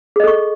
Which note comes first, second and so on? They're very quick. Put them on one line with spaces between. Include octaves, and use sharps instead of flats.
G#4 D#5 A4 C#6